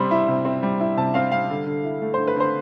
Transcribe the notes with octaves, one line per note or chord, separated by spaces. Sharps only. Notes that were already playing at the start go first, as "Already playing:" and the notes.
Already playing: C3 G3 C4 B5 C6
E4
C3
C4
G3
E4
C3 A5
C4 F5
G3 F5
D3
D3
E4
A3
D3 C5
B4
D3 C5